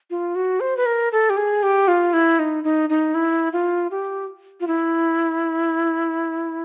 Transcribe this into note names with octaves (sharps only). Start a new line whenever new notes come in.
F4
F#4
C5
B4
A#4
A4
G4
G#4
G4
F4
E4
D#4
D#4
D#4
E4
F4
G4
F4
E4